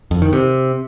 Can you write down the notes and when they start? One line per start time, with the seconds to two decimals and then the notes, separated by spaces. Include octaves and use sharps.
0.11 F2
0.22 D#3
0.33 C3